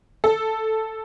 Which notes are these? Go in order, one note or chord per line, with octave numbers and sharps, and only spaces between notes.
A4